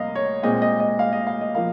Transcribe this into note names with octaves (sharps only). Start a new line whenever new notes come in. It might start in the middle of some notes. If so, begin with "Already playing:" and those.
Already playing: C2 A#3 D#5 F5
C#5
A#2 G#3 C4 D#5
D#5
D#5
F5
D#5
F5
D#5
F3 A#3 F5